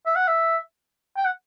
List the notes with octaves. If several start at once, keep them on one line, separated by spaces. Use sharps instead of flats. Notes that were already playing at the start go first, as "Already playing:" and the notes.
E5
F#5
E5
G5
F#5